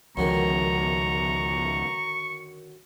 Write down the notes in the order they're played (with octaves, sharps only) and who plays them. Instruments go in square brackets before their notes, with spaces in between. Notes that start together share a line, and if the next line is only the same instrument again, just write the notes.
[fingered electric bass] C#2 F3 [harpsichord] F#2 D3 D#3 [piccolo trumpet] A#5 [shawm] C#6